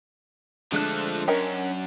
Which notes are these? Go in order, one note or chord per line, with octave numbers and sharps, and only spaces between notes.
D3 F3 G#3 A3 D4 A4 F#6
F#2 C#4 A#4 D#5 G5